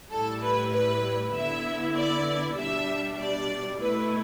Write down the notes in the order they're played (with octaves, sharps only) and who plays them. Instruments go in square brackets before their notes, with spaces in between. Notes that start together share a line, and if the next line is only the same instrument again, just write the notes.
[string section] A2 G3 E4 A4
B4
B4
D3 B3 E4 E5
D5
B2 G3 D4 E5
D5
B2 A3 E4 B4